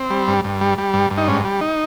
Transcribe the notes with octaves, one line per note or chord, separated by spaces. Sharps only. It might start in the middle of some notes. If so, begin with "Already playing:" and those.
Already playing: C4
G3
G2
G2
G3
G3
G2
G2
D#4
G#2 C#4
G3
D#4